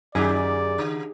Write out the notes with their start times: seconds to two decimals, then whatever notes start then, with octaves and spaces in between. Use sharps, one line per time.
0.15 F#2 D3 D#4 G4 G#4 D5
0.78 C#3